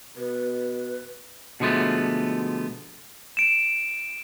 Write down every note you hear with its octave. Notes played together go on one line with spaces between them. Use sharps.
B2 B4
B2 D3 F3 G#3 A3 B3
D7 E7